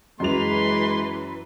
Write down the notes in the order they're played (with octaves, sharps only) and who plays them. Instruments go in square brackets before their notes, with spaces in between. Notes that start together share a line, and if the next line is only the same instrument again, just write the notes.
[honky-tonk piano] F#2 F#3 F7 [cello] E3 B4 [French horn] G#3 [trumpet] C6